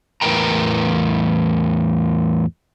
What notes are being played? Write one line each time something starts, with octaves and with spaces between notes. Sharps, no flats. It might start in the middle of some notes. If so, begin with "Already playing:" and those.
E2 A2 A#4 B4 G5 A#5